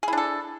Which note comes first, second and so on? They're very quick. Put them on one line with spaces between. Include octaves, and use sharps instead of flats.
G#4 E4 D4 A4